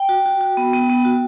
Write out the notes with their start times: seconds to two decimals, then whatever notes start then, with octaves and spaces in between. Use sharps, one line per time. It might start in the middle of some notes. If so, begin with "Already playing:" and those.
Already playing: G5
0.09 F#4
0.26 F#4
0.41 F#4
0.57 B3
0.73 B3
0.90 B3
1.05 F#4